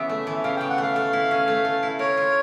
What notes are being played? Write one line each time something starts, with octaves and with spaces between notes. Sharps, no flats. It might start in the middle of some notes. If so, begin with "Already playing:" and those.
Already playing: C#3 E3 B3 E5
A3
E3
C#3 F5
C#3 G5
F#5
A3 F5
A4
E4
C#4
A3
A4
E4
A#4 C#5
F4